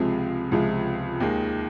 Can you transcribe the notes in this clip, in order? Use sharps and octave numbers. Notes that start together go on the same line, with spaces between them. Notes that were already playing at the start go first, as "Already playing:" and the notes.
Already playing: C#2 C3 F3 G#3 C4
C#2 C3 F3 G#3
D#2 D#3 G#3